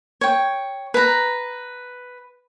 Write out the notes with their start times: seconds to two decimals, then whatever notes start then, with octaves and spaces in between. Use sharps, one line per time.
0.21 C#5 G5
0.94 B4 A#5